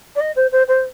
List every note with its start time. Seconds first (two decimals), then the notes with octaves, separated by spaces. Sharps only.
0.16 D5
0.21 D#5
0.36 C5
0.52 C5
0.68 C5